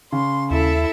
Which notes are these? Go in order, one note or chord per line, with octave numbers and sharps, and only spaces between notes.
C#3 C6
D#2 E4 A4 E5